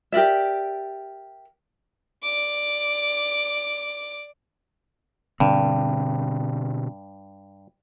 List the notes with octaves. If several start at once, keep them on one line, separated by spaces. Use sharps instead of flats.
G4 A#4 D5 E5
D5 D6
G2 B2 D3 C4